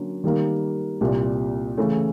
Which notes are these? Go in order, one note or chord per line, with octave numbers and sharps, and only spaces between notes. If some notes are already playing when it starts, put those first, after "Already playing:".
Already playing: D3 F#3 A#3 C#4
D#3 G3 A#3
C2 A#2 G3
C#3 E3 A3 C#4 E4